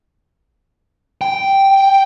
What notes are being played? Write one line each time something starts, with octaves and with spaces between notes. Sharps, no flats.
G5